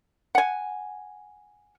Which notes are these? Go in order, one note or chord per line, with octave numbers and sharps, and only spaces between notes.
F#5 G#5